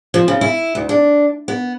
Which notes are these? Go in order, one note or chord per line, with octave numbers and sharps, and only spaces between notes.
F3
C#3
E4
D2
D4
B3